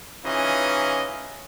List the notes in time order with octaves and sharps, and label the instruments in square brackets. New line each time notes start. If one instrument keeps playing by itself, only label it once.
[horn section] E3 C#4 D#4 F4 G#4 D#5